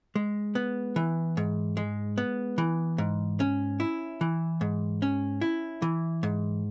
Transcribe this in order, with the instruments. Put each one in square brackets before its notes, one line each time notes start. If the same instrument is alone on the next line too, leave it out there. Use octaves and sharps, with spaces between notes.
[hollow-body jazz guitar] G#3
B3
E3
G#2
G#3
B3
E3
G#2
C#4
E4
E3
G#2
C#4
E4
E3
G#2